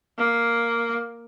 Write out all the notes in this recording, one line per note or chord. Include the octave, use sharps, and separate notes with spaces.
A#3